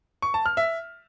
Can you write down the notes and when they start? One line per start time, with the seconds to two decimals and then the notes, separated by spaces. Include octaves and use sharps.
0.22 C#6
0.34 A5
0.46 F6
0.57 E5